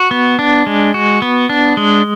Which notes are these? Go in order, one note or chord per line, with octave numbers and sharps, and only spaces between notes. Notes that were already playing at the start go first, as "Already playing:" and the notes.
Already playing: F#4
B3
D4
G#3
F#4
B3
D4
G#3